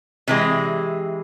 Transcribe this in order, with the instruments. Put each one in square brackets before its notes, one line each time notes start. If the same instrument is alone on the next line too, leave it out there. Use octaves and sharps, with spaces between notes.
[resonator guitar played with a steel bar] C3 E3 G#3